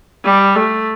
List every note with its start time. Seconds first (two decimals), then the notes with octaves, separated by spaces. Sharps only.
0.24 G3
0.55 A3